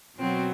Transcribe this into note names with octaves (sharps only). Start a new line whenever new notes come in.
B2 F#3 C4